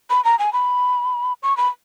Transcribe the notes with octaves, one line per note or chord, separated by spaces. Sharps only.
B5
A#5
G#5
B5
C#6
B5